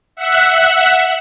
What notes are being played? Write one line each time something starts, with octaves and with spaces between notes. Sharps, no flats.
E5 F#5